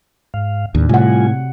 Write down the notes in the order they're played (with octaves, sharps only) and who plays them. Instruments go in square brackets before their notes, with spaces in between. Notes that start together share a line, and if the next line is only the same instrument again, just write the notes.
[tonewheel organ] G#2 F5
[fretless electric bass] D#2 [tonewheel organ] A2 D4
[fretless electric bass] A2 [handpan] C3 F#5 [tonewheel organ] G3 F4 G#5